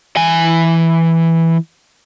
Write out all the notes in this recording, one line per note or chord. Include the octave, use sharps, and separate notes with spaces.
E3 G#5